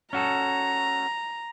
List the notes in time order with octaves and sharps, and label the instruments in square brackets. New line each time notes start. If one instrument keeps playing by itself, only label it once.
[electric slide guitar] C#4 F#4 A4 [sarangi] A#5